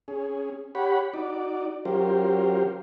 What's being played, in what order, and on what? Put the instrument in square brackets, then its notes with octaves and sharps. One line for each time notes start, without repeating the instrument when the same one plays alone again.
[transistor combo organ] C#4 G#4
G4 C#5 F#5 B5
D#4 F#4 D5
F#3 C#4 F4 G4 A#4 C5